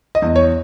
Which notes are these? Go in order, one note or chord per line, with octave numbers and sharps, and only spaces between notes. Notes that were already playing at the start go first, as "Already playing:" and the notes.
D#5
E2
C#5